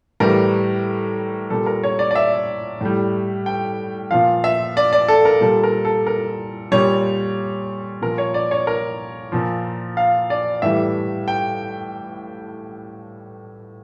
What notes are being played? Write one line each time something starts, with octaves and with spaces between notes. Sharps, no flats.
A2 E3 G3 A#4
A#2 G3 A4
A#4
C#5
D5
D5
E5
A2 G3
G5
A#2 F3 F5
E5
D5
D5
A4
A#4
A#2 G3 A4
A#4
A4
A#4
A#2 G3 C#5
A#2 F3 A#4
C#5
D5
C#5
A#4
A#2 F3
F5
D5
A2 E3 G3 E5
G5